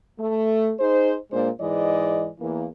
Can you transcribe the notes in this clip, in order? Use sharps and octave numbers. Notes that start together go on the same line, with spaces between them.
A3
D#4 G#4 C5
A#2 G#3 A#3 D4 C5
G#2 E3 G#3 D5 D#5
E2 E3 A#3